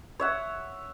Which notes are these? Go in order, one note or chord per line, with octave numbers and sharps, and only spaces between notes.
C#5 E5 F#5